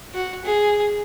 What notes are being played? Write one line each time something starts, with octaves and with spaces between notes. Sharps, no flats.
F#4
G#4